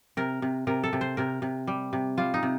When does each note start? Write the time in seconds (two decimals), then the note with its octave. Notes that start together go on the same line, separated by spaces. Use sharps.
0.17 C3 A#4
0.42 C3
0.67 C3 A#4
0.84 A4
0.93 C3
1.01 C5
1.17 C3 A#4
1.42 C3
1.68 G3
1.93 C3
2.18 G3 F4
2.34 D#4
2.43 C3